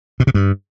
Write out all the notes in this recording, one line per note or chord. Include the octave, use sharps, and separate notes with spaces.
B2
C3
G2